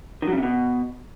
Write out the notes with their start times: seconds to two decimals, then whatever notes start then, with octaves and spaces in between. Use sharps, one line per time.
0.22 D#3
0.27 F#3
0.33 C#3
0.38 C3
0.43 B2